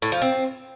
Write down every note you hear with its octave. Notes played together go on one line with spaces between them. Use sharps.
A2
F3
C4